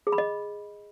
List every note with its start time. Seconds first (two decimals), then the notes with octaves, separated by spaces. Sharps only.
0.07 G#4
0.12 B5
0.18 D#5